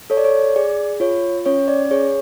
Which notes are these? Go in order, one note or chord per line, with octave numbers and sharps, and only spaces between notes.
A4 C#5
D5
C#5
G#4 D5
F4 C#5
C#4 C#5
D5
G#4 C#5